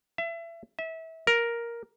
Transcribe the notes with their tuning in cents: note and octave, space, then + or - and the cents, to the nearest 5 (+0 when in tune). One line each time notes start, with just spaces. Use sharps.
E5 +30
E5 -25
A#4 +5